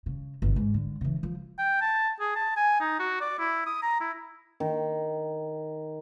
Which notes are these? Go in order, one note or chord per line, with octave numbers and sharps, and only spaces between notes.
C#3
G1 C3
G#2
D3
C#3 E3
F3
G5
A5
G#4
A5
G#5
D#4
F#4
D5
E4
D#6
A#5
E4
D#3